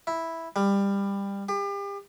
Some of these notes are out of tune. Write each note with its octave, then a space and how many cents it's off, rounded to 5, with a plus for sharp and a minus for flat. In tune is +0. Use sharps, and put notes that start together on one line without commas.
E4 -5
G3 +20
G4 +35